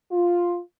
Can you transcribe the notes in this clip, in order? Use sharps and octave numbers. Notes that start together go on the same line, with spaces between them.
F4